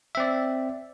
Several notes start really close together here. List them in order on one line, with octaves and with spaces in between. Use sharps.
E5 C4 D5